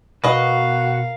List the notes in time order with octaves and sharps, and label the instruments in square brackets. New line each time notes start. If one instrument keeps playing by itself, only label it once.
[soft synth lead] B2 [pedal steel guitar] F#4 [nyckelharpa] A#4 F5 [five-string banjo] B4 D#5